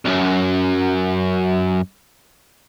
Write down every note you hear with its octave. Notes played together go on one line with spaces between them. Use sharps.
C2 F#2